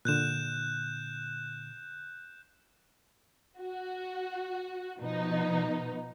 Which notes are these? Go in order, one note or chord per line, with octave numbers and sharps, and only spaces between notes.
A#2 D3 F#6 G6 E7
F#4
B2 F3 B3 D#4